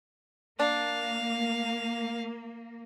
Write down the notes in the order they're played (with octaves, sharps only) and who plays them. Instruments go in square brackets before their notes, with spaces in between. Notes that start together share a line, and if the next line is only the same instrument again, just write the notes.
[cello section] A#3 [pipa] D4 [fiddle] F5